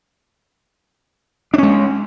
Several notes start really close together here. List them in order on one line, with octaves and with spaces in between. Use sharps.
D4 C#4 G#3